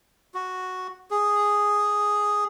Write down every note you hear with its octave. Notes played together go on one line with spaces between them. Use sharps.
F#4
G#4